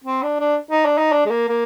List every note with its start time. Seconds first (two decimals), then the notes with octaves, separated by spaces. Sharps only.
0.04 C4
0.23 D4
0.40 D4
0.71 D#4
0.85 D4
0.98 D#4
1.12 D4
1.26 G#3
1.31 A#3
1.49 A#3